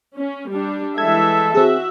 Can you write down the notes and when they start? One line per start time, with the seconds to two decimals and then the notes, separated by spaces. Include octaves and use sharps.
0.17 C#4
0.51 G3 D4
0.98 E3 G#3 A4 E5 G#6
1.55 C4 F#4 G#4 E5